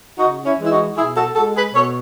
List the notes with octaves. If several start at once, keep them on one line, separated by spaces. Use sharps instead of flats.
C#3 D#4 F#4
C#4 E4
E3 G#3
E4
D#4 F#4
B2 E4 G#4
F#4 A4
G#3 F#4 A4
G#4 B4
B2 A4 C#5